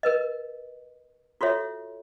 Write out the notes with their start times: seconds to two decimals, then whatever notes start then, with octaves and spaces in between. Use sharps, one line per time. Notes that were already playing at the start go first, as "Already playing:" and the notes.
0.03 A#4 B4 D#5
1.41 F4 F#4 A4 C#5 E5